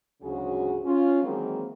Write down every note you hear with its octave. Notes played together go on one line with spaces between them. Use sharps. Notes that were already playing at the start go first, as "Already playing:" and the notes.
D2 G#2 C#3 F#3 F#4 G#4
C#4 F4
D#3 E3 F#3 G#3 A#3 C4